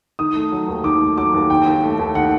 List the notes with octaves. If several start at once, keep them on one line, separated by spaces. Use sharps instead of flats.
D#3 D#6
A3
F#3
D#2
D#3 D6
A3
F#3 D6
D#2
D#3 G5
D#2
A3
D#2
D#3 F#5